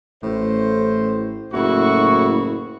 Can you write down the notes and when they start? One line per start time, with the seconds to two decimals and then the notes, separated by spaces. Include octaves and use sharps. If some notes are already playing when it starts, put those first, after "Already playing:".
0.23 A1 A2 C5
1.53 F#1 A2 E4 F#4 C#6